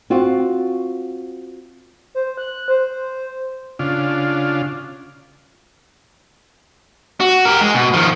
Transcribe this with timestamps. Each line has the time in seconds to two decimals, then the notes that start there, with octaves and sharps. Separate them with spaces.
0.10 C4 F4 F#4
2.15 C5
2.38 F#6
2.68 C5
3.79 C#3 D4 F4
7.20 F#4
7.45 G4 A#4
7.61 G#3
7.75 B2
7.93 D#3 F3